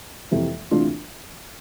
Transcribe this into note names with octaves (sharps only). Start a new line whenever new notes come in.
F2 C3 E3
D2 C3 E3 D4 F4